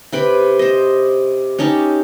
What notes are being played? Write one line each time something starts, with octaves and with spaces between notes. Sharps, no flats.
C3 B4 G5 B5
C5 D#5
C#4 D#4 G4 A5